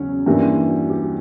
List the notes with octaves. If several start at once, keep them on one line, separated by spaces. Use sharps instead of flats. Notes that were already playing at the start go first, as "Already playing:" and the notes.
Already playing: E2 C#3 F#3 C#4
G2 E3 G3 A#3
F#4
G4